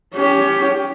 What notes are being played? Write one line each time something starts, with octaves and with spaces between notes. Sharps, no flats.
C#4 G4